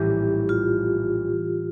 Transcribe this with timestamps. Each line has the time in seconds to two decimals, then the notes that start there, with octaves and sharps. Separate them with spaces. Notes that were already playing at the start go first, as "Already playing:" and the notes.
Already playing: A#1 A2 E3 G3 C#4 G4
0.49 F4